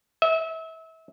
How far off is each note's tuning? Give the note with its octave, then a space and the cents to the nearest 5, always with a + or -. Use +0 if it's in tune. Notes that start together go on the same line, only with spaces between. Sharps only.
E5 -30